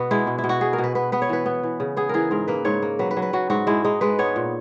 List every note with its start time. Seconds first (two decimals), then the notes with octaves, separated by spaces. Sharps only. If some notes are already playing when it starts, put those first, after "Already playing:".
Already playing: B2 B3 F#4 B4
0.11 G#3 E4
0.27 B2
0.38 E4
0.44 B2
0.49 F#4
0.61 B3 G#4
0.73 A#4
0.78 B2
0.84 B4
0.95 B3 B4
1.12 B3 B4
1.22 C#5
1.29 E3 B4
1.46 B3
1.63 E3
1.80 C#3
1.97 B3 G#4
2.09 E3 G#4 A#4
2.31 G#2 A#4
2.48 A#3 B4
2.65 G#2 C#5
2.82 A#3
2.99 F#3 B4
3.11 B4
3.17 F#3
3.22 B4
3.33 F#3 F#4
3.50 G#2 F#4
3.67 G#3 E4
3.84 G#3 D#4
4.01 G#3 B4
4.19 B3 C#5
4.36 A#2